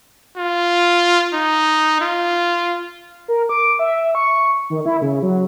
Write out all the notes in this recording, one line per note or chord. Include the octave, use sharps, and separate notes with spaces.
F4
D#4
F4
A#4
D6
E5
C#6
D#3
E4
C#3
F#3